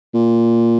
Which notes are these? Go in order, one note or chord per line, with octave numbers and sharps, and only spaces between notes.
A#2